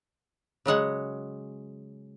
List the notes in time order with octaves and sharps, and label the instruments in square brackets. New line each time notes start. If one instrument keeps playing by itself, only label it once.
[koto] C#3 F#3 G#3 F#5